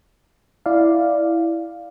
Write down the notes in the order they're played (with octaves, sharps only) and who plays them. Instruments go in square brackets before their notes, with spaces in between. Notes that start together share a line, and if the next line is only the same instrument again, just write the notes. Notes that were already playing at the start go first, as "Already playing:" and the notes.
[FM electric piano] E4 D5 F5